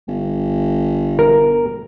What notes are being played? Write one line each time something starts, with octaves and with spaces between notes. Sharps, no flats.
G1
A#4